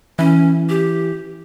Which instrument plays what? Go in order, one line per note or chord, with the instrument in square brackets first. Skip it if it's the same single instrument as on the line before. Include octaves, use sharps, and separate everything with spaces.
[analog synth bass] E3 [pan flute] C#4
[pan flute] G4